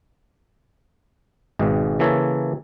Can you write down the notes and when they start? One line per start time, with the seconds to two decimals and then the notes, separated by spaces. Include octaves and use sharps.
1.59 G#1 G#2 B2
1.99 C#3 E3 A#3 A4 C#5